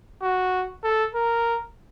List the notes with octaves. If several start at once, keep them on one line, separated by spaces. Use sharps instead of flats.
F#4
A4
A#4